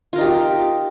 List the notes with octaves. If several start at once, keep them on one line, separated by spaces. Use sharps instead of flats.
D#4 F4 G4 A#4